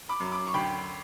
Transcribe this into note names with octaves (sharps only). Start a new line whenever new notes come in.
B5 D6
F#2
B5 D6
C#6
D2 G5 B5